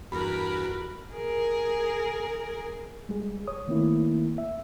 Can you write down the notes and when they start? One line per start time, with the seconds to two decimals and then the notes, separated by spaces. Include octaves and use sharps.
0.12 E2 G2 F#4 A#4 B4 B5
1.14 G#4 A#4
3.09 G3 G#3 G#4
3.47 C#5 D#6
3.68 D#3 A3 A#3 C4 E4
4.38 E5